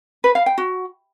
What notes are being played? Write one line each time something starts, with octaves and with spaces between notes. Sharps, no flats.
B4
F5
G5
F#4